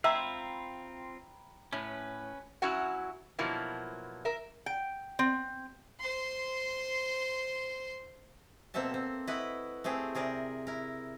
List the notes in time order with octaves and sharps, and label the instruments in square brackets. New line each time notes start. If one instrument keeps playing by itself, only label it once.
[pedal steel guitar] C4 F4 [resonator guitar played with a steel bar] E5 [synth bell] G5 A#5 B5 [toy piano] E6
[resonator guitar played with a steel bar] A2 [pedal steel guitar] C#4 B4
[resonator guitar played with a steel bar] F#3 C#4 E4 F#4 F#5
B2 F3 F#3 A#3 E4
A#4 E5
G5
C4
[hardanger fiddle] C5 C6
[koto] B2 A#3 C4 A4 E5 A5
C4
E4 F#4 B4 D#5
A3 C4 G4 G#4
C3 G#4 A#4 D5
E4 A#4